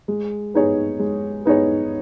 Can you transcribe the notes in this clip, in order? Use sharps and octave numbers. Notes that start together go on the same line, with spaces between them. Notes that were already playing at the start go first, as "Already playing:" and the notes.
G#3
B3 D#4 G#4 C#5
G#3
B3 D#4 G#4 C#5